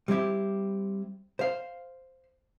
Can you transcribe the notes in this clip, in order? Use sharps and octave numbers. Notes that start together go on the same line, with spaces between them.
G3 C4 E4 G4
C5 F5